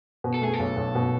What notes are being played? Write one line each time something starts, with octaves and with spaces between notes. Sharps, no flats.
B2
A4
A3 G#4
A4
B1
B1
B2